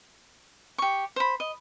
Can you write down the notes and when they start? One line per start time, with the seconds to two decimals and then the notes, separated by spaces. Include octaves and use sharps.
0.78 G4 C#6
1.16 C5 B5
1.40 D#5